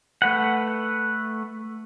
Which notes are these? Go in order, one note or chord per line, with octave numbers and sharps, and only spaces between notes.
A3 B4 F#5